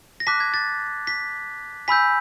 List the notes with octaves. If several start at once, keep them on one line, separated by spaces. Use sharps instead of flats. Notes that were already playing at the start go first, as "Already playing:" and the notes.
A#6
A5 D6 F#6 B6
G#6
A6
B6
G#5 B5 E6 G6 B6